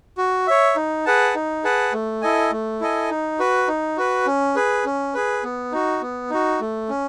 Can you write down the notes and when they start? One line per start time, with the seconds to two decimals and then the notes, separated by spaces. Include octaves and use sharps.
0.18 F#4
0.47 C#5 E5
0.76 D#4
1.05 G#4 B4 F#5 A5
1.35 D#4
1.64 G#4 B4 F#5 A5
1.93 A3
2.22 E4 A4 D#5 G#5
2.51 A3
2.81 E4 A4 D#5 G#5
3.10 D#4
3.39 F#4 B4
3.68 D#4
3.97 F#4 B4
4.27 C#4
4.56 G#4 B4
4.85 C#4
5.14 G#4 B4
5.44 B3
5.72 D#4 F#4
6.02 B3
6.30 D#4 F#4
6.61 A3
6.89 C#4